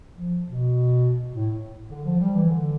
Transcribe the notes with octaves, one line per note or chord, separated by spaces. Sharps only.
F3
B2
A2
D3
F3
G3
E3
D3